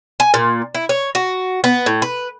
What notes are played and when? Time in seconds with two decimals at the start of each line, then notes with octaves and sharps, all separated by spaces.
0.20 G#5
0.34 A#2
0.75 E4
0.89 C#5
1.15 F#4
1.64 B3
1.86 A2
2.02 B4